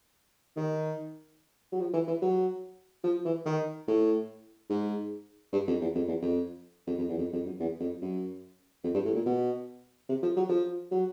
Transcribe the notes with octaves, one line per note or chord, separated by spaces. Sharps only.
D#3
F#3
F3
E3
E3
F#3
F3
E3
D#3
A2
G#2
G2
F2
E2
F2
E2
F2
F2
F2
E2
F2
F2
F#2
E2
F2
F#2
F2
G2
A2
A#2
B2
C3
F3
F#3
F3
F#3